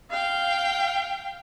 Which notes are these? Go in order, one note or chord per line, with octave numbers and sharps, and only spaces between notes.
F5 G5